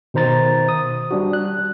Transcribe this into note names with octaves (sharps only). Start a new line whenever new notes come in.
B2 D#3 C5 A#5 A6
D#6
G3 D4 F#4
F#6